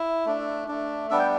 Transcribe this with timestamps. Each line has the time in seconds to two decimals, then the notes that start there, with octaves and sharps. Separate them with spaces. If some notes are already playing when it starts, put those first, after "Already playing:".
Already playing: E4
0.26 A3 D4
0.68 A3 D4
1.11 G3 B3 D4 E5
1.19 G5